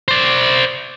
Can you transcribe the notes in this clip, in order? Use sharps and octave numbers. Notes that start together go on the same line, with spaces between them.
C5 D5